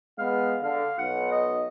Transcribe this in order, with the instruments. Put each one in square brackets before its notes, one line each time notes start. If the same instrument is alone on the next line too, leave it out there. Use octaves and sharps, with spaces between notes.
[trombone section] G#3 B3 [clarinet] F5
[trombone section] D3 [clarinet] F5
[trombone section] B1 [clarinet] F#5
[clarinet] D#5